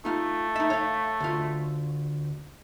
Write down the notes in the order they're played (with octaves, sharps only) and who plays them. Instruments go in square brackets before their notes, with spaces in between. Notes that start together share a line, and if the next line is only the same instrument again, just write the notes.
[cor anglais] A3 [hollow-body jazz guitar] D#4 F4
[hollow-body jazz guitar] D#4 E5
C#5 F5
D2 F4